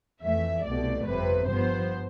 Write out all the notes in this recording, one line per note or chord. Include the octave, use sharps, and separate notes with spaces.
F2 E3 A3 E5
C2 B2 A3 D5
G1 F2 C3 B4
G2 F3 B3 C5